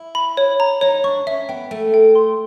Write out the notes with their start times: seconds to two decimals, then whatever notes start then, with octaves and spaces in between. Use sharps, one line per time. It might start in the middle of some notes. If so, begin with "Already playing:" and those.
Already playing: E4
0.15 B5
0.37 C#5
0.60 A#5
0.81 D#4 C#5
1.04 D4 C#6
1.27 C#4 E5
1.49 B3 G5
1.71 A3 G5
1.94 G5
2.15 C6